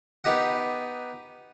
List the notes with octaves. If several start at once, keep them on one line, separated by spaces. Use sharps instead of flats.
B3 D#4 G4 D#5 F#5